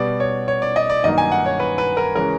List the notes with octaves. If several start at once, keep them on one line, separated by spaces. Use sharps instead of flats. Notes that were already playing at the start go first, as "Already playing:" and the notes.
Already playing: B2 G3 B3 D5
C#5
C#5
D5
D#5
D5
G2 D#3 F#3 A#3 D#5
G#5
F#5
C#5
B4
B4
A#4
C#3 E3 G#3 C#4 A#4